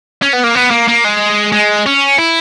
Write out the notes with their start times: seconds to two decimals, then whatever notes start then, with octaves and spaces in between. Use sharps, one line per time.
0.22 C#4
0.33 B3
0.43 A#3
0.55 B3
0.70 A#3
0.88 A#3
1.04 G#3
1.52 G#3
1.86 C#4
2.19 E4